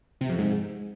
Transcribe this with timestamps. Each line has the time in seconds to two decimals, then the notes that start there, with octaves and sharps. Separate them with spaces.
0.21 C3
0.30 F2
0.38 G#2